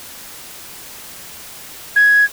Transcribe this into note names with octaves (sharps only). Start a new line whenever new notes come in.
G#6